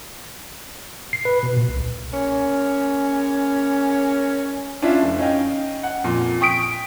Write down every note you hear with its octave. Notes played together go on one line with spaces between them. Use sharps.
C7
B4
B2
A#2
C2
G#3 A#3 C#4
C#4 D4 E4 F4 E5
F1
C#4 D#4 D#5 F5 G5
F#5
F2 A#2
G5 C#6 D#6 B6 D7